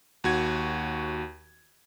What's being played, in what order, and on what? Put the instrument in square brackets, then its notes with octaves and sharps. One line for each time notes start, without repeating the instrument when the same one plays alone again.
[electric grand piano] D#2 F#4 G#6